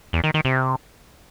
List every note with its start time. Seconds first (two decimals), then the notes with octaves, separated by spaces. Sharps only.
0.13 E2
0.24 D#3
0.34 D#3
0.45 C3